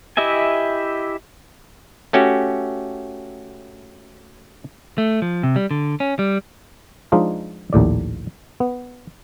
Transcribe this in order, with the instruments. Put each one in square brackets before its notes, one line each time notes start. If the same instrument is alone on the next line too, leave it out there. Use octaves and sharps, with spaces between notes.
[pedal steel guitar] E4 G4 D#5 E5 G#5
[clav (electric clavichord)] A3 C#4 F#4 G4
[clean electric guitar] A3
F3
C3
G3
D3
C#4
G3
[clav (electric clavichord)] F3 G#3 D4 D#4 F4
A#1 D#2 A2 D5
B3